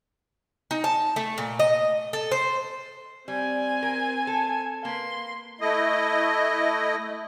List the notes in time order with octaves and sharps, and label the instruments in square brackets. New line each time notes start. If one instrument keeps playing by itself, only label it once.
[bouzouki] D#4
A5
A3
A#2
D#5
A4
C5
[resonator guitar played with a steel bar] G3 [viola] C4 G#5
[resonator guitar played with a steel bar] A#4
A4
[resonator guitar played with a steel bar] A#3 B4 [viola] C6
[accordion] A3 E4 D#5